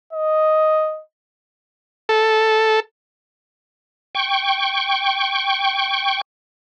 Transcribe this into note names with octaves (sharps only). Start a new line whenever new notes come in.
D#5
A4
G5 C#6